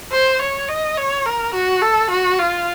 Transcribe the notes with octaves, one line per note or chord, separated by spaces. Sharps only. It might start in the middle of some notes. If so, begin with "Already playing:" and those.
C5
C#5
D#5
C#5
A#4
F#4
A4
F#4
F4